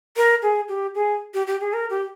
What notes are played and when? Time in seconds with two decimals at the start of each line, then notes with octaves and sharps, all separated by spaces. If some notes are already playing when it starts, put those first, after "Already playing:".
0.17 A#4
0.42 G#4
0.69 G4
0.95 G#4
1.34 G4
1.47 G4
1.61 G#4
1.73 A#4
1.90 G4